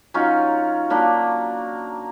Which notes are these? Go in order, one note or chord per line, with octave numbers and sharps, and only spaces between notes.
F#3 C#4 D#4 F4
F#3 A#3 D4 B5